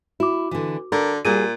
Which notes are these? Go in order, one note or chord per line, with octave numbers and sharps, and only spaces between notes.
E4 F#4 D6
D3 E3
D3 A#4
A#2 G3 F#4 G#4 D#7